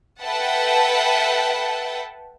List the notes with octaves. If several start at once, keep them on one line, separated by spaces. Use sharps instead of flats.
A4 B4 E5 F#5 G5 A5